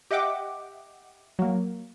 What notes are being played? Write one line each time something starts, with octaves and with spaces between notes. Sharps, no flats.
G4 D#5 E5 F#5 G5 D6
F#3 A#3